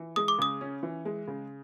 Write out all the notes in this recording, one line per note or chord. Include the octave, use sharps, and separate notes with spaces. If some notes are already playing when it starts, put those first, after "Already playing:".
Already playing: E3
G#3 D#6
D6
C#3 D#6
C#4
E3
G#3
C#3